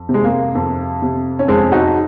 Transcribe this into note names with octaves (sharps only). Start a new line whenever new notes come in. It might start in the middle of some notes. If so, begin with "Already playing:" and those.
Already playing: F2
C3
G#3
A#3
F2
C3
C#4
F2 G#3 C4
D#4 F#4